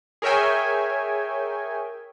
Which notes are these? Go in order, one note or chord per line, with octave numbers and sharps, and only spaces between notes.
G#4 A#4 C#5 E5 G5 G#5